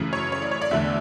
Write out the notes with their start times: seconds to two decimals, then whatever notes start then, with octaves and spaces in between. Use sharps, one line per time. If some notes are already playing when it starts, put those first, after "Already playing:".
Already playing: F#2 C#3 E3 A3
0.13 C#5
0.32 C#5
0.42 D5
0.51 C#5
0.61 D5
0.71 E2 D3 A3 E5